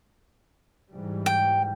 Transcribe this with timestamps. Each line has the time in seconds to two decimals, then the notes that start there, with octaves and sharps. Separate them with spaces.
0.91 G#2 E3 G3
1.26 G5